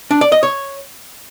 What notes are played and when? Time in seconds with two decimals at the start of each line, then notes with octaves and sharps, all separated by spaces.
0.11 D4
0.21 D5
0.32 D#5
0.43 C#5